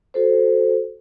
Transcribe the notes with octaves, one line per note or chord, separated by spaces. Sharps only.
F#4 A4 C5